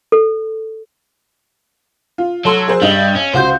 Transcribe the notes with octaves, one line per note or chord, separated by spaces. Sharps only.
A4
F4
F#3 A4 C6 E6
G#4 A#4 C5
G2 G3 D#5
C#4
C#2 F#4 C5 G6